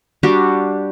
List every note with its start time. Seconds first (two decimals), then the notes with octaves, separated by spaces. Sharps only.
0.23 G3 D4 F#4 G4